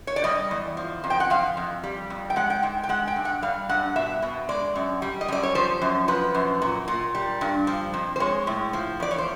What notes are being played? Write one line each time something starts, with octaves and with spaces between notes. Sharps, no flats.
C#5
D5
G3 D#5
E2
F3
F2
G5
F#5
F3 F5
F2
G3
F2
G5
G#3 F#5
G5
G#2
G5
G#3 F#5
G5
G2
F#5
G3 F5
G2 F#5
B2 E5
B2
G#3 D5
F#2
G3
D#5
F#2 D5
C#5
F3 C5
F#2
F3 B4
F#2
A#2
A#2
G3
G2
F3
F2
C5
G#3 C#5
A2
F3
E2 D5
C#5
C5